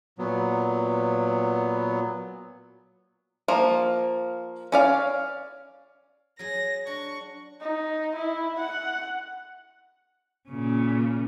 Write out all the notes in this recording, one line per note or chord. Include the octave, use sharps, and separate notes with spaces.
A#2 F#3 B3
F3 A#3
C#4 D5 F5
F#3 G#4 A#6
D4 C#6
D#4
E4
F#5
A#2 C#3